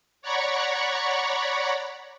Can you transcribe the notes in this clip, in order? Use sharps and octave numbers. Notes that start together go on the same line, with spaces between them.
C#5 D5 F#5 A#5 B5 C#6